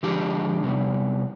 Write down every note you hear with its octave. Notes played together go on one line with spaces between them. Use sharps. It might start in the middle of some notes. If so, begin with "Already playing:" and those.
D3 F3 G#3 D4 G4
C3 G3 B3